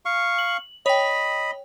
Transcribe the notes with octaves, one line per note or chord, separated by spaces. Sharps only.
F5 C#6
F#7
C#5 D#5 G5 B5